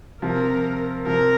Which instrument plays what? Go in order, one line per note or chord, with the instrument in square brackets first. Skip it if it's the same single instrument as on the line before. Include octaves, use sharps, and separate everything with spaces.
[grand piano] C3 F3 [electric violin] A#4
[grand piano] C3 F3 [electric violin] A#4